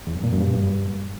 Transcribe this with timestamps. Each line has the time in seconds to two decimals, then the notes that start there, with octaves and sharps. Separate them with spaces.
0.07 E2
0.15 F#2
0.24 A#2
0.32 F#2
0.41 G2